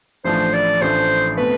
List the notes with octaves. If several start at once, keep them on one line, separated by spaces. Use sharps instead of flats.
A1 A2 F3 A3 D4 C5
D5
A1 A2 F3 A3 D4 C5
B2 A3 C4 B4